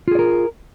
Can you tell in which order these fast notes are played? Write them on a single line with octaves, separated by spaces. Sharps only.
F4 G#4 D5 A#4